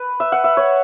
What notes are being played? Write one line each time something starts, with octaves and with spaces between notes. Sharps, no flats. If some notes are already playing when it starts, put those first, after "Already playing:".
Already playing: B4
E5
F#5
E5
C#5